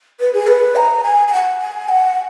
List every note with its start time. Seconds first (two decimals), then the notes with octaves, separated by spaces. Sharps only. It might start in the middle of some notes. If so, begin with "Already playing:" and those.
0.20 B4
0.33 G#4
0.47 B4
0.76 A#5
1.04 G#5
1.27 G#5
1.33 F#5
1.62 G#5
1.89 F#5